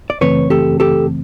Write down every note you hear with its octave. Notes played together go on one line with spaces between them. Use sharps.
D5
F#2 C#3 E3 A3 C4 B4 C#5
G4 A4
G4 A4